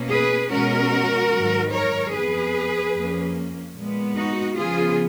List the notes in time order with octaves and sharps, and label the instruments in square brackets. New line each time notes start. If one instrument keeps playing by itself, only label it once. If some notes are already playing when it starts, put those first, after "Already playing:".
Already playing: [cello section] B2 A#3 C#4
G#4 B4
B2 G#3 C#4 F#4 A#4
G#2 D#3 F#3
A#4 C#5
F2 F3 B3 G#4 B4
F2 F3 A#3 C#4
A#2 G#3 B3
D#4 F#4
C#3 F3 B3 F4 G#4